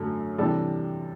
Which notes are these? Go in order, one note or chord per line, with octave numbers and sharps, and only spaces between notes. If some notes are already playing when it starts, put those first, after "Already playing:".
Already playing: F#2 D3 F#3 A3
C3 E3 G3 D4 A4